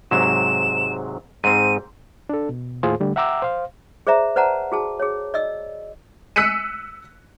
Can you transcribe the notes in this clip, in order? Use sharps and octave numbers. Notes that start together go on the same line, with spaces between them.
G#2 C3 F#3 E7
G#2 C4 D#7
D4 A4
B2
D#2 A2 F4 G#4 C5
D3 G3 A3
E5 F#5 G5 A#5 D6 E6
C5 F5
G#4 C5 D5 E5 A#5
B4 C5 D5 F#5 A5 A#5
F#4 G#4 A5
G#4 C#5
D5 D#5 E6
E6 F#6 B6 C#7 D#7